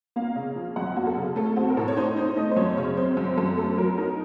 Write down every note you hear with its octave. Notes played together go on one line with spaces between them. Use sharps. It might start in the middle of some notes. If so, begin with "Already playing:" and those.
A#3 F5
C#3
F3
F#2 F#5
A#3 F#4
A4
C#3
A3 A4
C4 F#4
A#4
A2 A4
C#5
D#4 C5
D#4 C5
A3 D#5
C5
F#2 C#5
C#3 C#5
C4 C5
F#2
F#2 A4
A3 A4
F#3 A#4
D#4 A#4